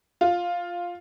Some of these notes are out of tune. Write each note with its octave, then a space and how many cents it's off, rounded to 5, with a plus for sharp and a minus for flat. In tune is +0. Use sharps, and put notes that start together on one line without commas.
F4 +5